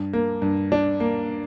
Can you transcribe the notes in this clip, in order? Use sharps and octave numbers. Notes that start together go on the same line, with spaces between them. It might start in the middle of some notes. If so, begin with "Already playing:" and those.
Already playing: G2
A#3
G2
D4
A#3